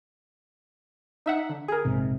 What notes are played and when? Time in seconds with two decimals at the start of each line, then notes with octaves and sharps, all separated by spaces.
1.26 D#4 E5 F#5
1.49 D3
1.68 G#4 A#4
1.85 A#1 G#2 C3